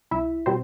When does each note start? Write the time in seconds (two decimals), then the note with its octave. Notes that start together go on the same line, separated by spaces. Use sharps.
0.11 C2 E4 E5
0.46 B2 G3 C4 C5